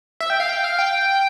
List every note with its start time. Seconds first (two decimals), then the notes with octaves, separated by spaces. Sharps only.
0.20 E5
0.30 G5
0.40 F5
0.49 G5
0.64 F5
0.79 G5